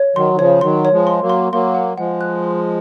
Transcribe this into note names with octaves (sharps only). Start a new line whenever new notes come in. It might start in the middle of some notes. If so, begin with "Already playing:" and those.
Already playing: C#5
D#3 F#3 C6
D#3
C#3 F3 C#5
D#3 F#3 C6
C#5
F3 G#3
C6
F#3 A#3
C6
F#3 A#3 C6
F#5
F3 G#3 F#5
F#6
C6